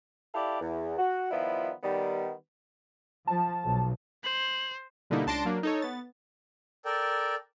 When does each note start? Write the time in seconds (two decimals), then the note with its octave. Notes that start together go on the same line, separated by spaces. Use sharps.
0.35 E4 G4 A4 D5 F5 D6
0.61 E2
0.98 F#4
1.31 D#3 F3 G3 B3 E4 F4
1.83 D#3 G3 B3
3.27 F3 A5
3.64 B1
4.24 C5 F#7
5.10 B2 D3 G3 A#3 D#4 E4
5.26 C#2 D4 A5 C6 A#6 D7
5.45 F#3 A#3 D4
5.63 D#4 A4 C#5
5.82 B3 A6
6.85 A4 A#4 D5 G5